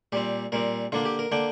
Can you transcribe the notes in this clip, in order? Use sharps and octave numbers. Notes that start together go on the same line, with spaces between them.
A#2 G3 C4 G4
A#2 G3 C4 A#4
D3 A#3 D4 F4
G4
A#4
D3 A#3 D4 G5